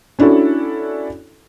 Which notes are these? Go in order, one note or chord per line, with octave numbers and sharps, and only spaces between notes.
C#4 D4 E4 F#4 A4